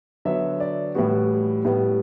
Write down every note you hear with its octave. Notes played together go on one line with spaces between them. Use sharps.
D3 F#3 B3 E5
D5
A2 E3 G3 B3 F#4
A2 G3 B3